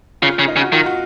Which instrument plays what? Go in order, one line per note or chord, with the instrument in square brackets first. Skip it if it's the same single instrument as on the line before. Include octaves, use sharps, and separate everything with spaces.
[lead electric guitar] C#3 [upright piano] F4
[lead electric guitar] C#3
[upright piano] D#4
[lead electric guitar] C#3
[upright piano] F#4
[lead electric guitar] D#3 [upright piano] F4
[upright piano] F#4